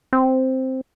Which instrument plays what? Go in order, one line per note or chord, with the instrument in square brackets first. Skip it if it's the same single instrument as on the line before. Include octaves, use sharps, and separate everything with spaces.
[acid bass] C4